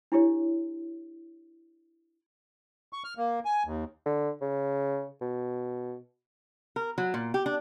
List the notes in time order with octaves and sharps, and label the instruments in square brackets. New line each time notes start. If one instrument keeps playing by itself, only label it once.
[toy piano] D4 E4 G4 C#5
[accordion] C#6
F6
A#3
G#5
D#2
[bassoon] D3
C#3
B2
[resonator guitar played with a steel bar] A#4
F#3
A#2
G4
D4